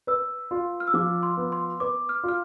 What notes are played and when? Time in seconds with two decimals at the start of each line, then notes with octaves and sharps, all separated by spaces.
0.07 B4 E6
0.51 F4
0.80 F6
0.87 E6
0.94 F3 D6
1.23 C6
1.37 B3
1.52 C6
1.80 B4 D6
2.09 F6
2.24 F4 F6